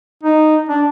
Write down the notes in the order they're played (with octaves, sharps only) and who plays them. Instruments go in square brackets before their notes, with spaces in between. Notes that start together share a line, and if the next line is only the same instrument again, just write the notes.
[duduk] D#4
D4